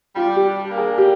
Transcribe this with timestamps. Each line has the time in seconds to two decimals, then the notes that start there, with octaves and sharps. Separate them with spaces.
0.16 G3 F4
0.36 G4
0.43 D4
0.71 A#3
0.78 G#4
0.98 G3 G4